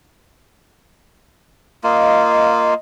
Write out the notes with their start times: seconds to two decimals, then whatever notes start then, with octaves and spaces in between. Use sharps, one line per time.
1.84 A#3 F4 D#5